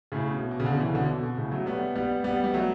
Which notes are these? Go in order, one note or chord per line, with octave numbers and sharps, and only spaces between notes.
A2 C#3
B2
B2
C#3
B2 D3
C#3 E3
B2 D3
B2
B2
A2 C#3
F#3 A3
G3 B3
G3 B3
G3 B3
G3
F#3 A3